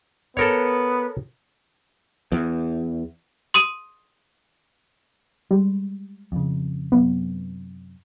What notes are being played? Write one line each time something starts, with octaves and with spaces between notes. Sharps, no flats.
B3 A4 A#4 C#5
E2
C6 D#6 D#7
G3 G#3
F2 C#3
F#2 C3 B3